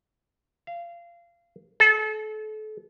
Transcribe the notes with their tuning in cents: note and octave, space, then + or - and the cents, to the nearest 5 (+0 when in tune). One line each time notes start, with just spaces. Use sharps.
F5 -25
A4 -35